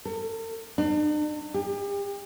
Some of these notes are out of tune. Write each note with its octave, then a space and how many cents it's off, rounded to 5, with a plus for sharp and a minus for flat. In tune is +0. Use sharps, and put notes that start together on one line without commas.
A4 +45
D4 +45
G4 +40